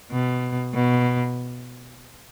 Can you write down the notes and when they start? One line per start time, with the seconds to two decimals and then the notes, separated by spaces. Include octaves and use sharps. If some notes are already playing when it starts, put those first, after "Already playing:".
0.11 B2
0.74 B2